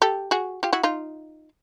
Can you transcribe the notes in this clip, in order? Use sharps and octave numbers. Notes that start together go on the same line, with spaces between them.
G4 A4
F#4 G#4
F4 G4
E4 F#4
D#4 F4